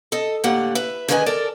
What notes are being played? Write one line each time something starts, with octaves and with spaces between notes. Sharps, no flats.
A4 D#5
A2 D3 G3 A#3 F#5
B4 E5
D3 D#3 G#3 B4 D#5 G#5
A4 A#4 D5